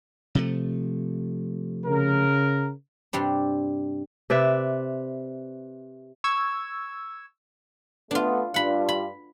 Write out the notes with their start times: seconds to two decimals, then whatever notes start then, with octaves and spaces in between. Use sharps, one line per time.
0.35 C3 F3 A3
1.86 C#3 A#4
3.13 G2 C3 G3 D4
4.30 C3 B4 D5 E5
6.24 C#6 E6 G#6
8.11 A3 B3 D4 F4
8.54 G2 D4 F4 F#5 B5
8.89 B5